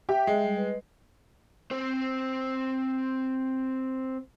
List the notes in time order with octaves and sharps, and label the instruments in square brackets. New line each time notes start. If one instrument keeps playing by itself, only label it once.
[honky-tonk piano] G4 [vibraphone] E5 [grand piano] G5
[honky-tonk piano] G#3
[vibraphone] G3
B4 D#5
[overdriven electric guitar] C4 C5